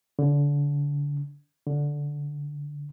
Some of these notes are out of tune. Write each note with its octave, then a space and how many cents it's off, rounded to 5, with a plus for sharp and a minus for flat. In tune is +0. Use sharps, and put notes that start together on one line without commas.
D3 -30
D3 -10